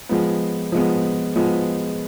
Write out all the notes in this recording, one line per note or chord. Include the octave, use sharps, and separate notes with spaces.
F3 G#3 B3
F3 G#3 B3
F3 G#3 B3